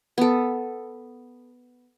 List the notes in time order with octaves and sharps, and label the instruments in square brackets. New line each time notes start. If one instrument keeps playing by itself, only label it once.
[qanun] B3 A4